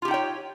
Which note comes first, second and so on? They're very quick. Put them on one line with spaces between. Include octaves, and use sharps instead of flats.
F4 G4 D#4 G5 C#5